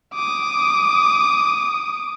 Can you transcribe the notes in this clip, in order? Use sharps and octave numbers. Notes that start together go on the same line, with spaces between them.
D6 D#6